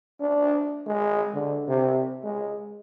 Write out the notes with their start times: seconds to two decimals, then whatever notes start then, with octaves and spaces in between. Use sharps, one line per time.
0.20 D4
0.87 G#3
1.34 D3
1.68 C3
2.24 G#3